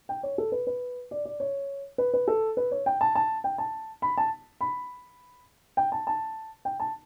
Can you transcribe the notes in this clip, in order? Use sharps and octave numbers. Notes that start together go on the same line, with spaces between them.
G5
C#5
A4
B4
B4
D5
D5
C#5
B4
B4
A4
B4
C#5
G5
A5
A5
G5
A5
B5
A5
B5
G5
A5
A5
G5
A5